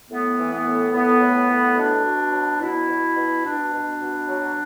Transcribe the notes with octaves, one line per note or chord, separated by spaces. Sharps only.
A2 B3
E3
B3
A2
A2 B3
A2
A2
B2 D4
B2
F#3
B2 E4
B2
B2
B2 D4
B2
B2
F#3